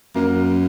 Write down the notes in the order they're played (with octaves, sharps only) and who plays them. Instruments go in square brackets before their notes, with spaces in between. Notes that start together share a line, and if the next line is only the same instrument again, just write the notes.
[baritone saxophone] F#2 [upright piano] A#3 A#4